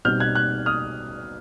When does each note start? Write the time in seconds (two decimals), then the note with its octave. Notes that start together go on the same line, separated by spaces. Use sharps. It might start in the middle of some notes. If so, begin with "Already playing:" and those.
0.05 B2 G3 C4 D#4 F6 G6
0.20 F#6 G#6
0.35 F#6 G#6
0.66 D#6 F6